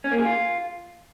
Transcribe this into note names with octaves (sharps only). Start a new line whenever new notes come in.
C#4
A#3
G#4
F4